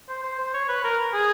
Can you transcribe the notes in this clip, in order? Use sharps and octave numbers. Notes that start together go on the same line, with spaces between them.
C5
C5
C5
C#5
B4
A#4
G#4